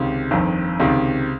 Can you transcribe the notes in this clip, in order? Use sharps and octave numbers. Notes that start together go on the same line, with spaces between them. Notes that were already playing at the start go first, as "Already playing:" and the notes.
Already playing: C#2 C3 D#3
G1 F2 D#3
C#2 C3 D#3